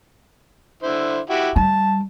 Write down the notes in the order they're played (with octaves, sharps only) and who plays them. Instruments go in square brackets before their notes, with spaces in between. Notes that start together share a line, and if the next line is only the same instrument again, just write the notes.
[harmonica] D3 E4 C5
E4 F#4 G4
[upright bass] G3 [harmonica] A5